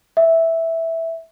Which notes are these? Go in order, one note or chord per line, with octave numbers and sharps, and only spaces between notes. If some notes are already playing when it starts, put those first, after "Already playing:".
E5